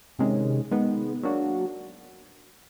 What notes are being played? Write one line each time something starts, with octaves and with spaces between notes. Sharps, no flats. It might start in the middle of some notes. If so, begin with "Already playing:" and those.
C3 D#3 G#3 C#4
D#3 G#3 B3
F#3 A#3 D4 F#4